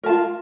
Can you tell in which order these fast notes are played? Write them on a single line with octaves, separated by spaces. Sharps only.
A#4 A5 F4